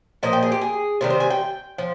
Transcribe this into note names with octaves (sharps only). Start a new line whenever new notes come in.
A#2 F3 A#3 D#5
G5
G#4
G4
G#4
C3 D#3 G3 A#4
C5
G#5
G5
F3